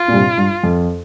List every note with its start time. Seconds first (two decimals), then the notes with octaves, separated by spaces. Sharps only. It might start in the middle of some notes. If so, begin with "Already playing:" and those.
Already playing: F4
0.08 A#2
0.13 G2 C3
0.38 G2
0.64 F2